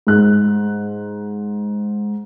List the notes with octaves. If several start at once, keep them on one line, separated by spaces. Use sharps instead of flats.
G#2 F#6